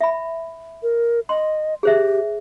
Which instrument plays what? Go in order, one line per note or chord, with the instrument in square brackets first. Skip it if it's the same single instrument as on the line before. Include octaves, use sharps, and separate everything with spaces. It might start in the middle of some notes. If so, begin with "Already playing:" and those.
[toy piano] E5 B5
[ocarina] A#4
[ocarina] D#5 [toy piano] C6
[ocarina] G4 [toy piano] G#4 C5 E5